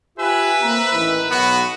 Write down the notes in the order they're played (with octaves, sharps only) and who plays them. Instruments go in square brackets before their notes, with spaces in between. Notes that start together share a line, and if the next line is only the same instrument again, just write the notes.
[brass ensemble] F4 G4 [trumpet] B4 [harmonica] E5 [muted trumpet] G#5
[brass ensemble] A#3 C4 [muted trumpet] A#5
[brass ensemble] A1 D#3 E3 [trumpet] B4
[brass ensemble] B1 [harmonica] B3 [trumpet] F#4 [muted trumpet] F#5